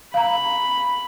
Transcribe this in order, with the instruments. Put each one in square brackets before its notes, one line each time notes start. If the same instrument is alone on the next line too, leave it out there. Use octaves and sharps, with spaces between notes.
[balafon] F5 A#5 [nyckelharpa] B5